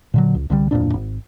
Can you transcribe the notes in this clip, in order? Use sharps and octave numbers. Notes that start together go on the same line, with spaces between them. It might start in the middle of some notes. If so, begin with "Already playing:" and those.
A#2 D3 F#3
C#2
C2 D3 F#3 G3
D1 F2 A#2 D4
G#1